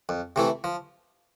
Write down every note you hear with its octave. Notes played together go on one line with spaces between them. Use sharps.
F2
C3 E3 A3 E4
F3